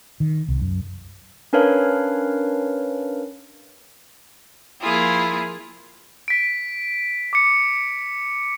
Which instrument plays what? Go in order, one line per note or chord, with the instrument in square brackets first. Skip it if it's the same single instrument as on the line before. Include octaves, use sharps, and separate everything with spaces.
[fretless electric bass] D#3
C2
F#2
[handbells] C#4 D4 A#4 B4 C#5 F5
[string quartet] F3 A#3 E4 F4 G#4
[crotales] B6 D7
D6 C#7